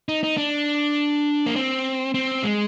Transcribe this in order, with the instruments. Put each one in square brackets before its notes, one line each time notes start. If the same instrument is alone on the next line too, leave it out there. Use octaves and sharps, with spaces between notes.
[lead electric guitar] D#4
D#4
D4
A#3
C4
C4
G#3